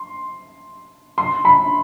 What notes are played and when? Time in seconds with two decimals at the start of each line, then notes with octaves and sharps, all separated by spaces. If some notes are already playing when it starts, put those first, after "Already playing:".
Already playing: C6
1.18 C6
1.45 B5